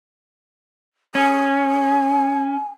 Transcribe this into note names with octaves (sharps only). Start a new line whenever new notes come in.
C#4 G#5